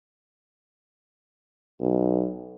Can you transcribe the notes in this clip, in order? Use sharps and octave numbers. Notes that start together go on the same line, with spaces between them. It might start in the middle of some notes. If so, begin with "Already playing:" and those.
B1